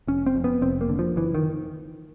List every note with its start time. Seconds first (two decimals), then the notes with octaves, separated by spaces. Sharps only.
0.07 F1 C#4
0.26 C4
0.36 F2
0.44 B3
0.61 F1 C4
0.81 A#3
0.89 D3
0.99 F3
1.16 F#1 E3
1.35 D#3